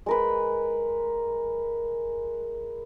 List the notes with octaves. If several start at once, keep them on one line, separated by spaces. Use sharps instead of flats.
G#3 A#4 B4